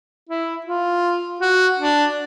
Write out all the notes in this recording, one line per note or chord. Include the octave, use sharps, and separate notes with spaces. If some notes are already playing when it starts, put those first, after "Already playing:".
E4
F4
F#4
D4